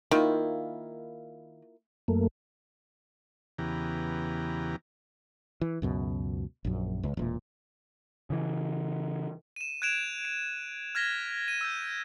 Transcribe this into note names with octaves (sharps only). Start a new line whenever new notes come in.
D#3 A#3 E4 F4
F#2 A3 A#3
E2 C#3 E3 B3 G4 A#5
E3
C#2 F#2 B2
A#1 F#2
C#2
E1 A#2
C#3 E3
D#7 E7
F#6 G#6 D7 E7 F7
D7
F6 G#6 A#6 B6 G7
D#7
E6 G6